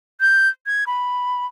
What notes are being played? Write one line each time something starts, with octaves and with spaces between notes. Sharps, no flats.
G6
G#6
B5